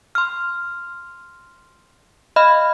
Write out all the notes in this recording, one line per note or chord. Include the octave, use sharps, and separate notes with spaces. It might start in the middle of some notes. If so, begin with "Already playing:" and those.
C6 F6
D#5 F5 B5 F6